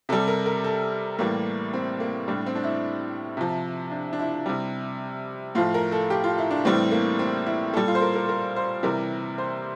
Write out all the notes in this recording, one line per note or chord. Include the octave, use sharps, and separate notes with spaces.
C3 G3 A4
A#4
A#4
A4
A2 E3 G3 A#3
C4
A#3
A2 G3 D4
C4
D4
E4
C3 F3
D4
D4
E4
C3 G3
A2 F3 F4
A#4
A4
G4
F4
E4
D4
A2 E3 G3 C4
A#3
C4
E4
A#2 G3 A4
F4
C5
A#4
A#4
A#4
C5
C3 E3 G3 A#4
C5